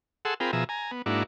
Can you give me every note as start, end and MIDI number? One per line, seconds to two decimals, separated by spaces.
0.25 0.34 68
0.25 0.34 69
0.25 0.34 78
0.25 0.34 84
0.25 0.34 88
0.40 0.51 60
0.40 0.51 65
0.40 0.51 68
0.40 0.51 70
0.40 0.51 79
0.40 0.51 83
0.53 0.64 47
0.53 0.64 53
0.53 0.64 68
0.53 0.64 76
0.53 0.64 82
0.69 0.91 80
0.69 0.91 82
0.91 1.02 59
1.06 1.23 44
1.06 1.23 58
1.06 1.23 62
1.06 1.23 64
1.06 1.23 66